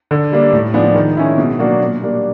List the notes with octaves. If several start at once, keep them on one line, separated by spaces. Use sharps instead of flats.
D3
G3 A#3 D4
A2
F3 G#3 B3 D4
D#3
G#3 C#4 E4
B2
F#3 A#3 D4 F#4
A#2
G3 A#3 D4